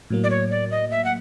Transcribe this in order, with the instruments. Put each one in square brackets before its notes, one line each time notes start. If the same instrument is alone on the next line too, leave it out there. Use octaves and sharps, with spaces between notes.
[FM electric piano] A2 F#3 A#3
[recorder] D5
C#5
D5
D#5
E5
F#5